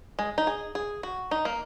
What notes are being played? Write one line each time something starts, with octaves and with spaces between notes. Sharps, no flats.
G#3
D#4
G#4
G#4
F#4
D#4
A#3